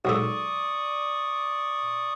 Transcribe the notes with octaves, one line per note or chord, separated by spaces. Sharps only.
B1 G#2 A4 D5 C#6 D#6